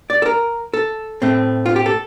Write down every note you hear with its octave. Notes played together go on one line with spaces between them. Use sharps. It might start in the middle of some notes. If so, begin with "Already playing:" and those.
D5
A4
A#4
A4
A2 A3 C4
F4
G4
A4